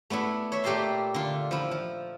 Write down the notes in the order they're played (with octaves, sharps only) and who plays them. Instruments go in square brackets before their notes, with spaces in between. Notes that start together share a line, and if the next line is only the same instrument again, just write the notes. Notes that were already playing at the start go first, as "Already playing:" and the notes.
[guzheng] A3 B3 D4 E4
C#5 E5
A#2 A3 G4 A#4 A5 C6
D3 F4
F3 E4
F3